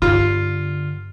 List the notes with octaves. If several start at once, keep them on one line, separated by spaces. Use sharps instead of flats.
G2 D3 F4